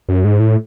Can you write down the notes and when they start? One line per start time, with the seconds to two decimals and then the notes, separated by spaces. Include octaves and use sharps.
0.09 F#2
0.25 G#2
0.40 A2